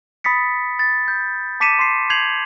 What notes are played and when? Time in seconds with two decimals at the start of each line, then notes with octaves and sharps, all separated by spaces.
0.24 B5 D#6 A6 B6 C#7
0.79 A6
1.08 G6
1.60 A5 D6 B6 C#7 D#7 E7
1.79 C6 C7
2.10 G6 G#6 C7 F7 F#7